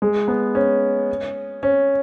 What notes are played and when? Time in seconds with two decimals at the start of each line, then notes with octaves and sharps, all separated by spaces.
0.02 G#3
0.28 B3
0.55 C#4
1.63 C#4